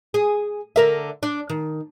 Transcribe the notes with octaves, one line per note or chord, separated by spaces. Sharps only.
G#4
D3 A#4 E5
D4
D#3